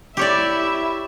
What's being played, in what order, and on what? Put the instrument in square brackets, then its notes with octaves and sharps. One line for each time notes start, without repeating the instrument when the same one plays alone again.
[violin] E4 E5 [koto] G4 C#5 D5